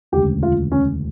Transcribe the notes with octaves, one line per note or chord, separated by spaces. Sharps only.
E1 D2 C#3 G4
F4
C#4